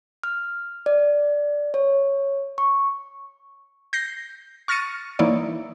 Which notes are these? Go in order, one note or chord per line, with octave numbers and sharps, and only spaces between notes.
F6
D5
C#5
C#6
G6 A#6 C7
C#6 F6 A6 A#6 C#7 D#7
E3 A#3 D#4 E4 C#5 D5